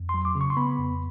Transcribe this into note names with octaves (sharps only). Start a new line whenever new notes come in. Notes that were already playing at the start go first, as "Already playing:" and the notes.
Already playing: F2
C6
F#3
D6
C#3
C#6
C6
B3 B5
F2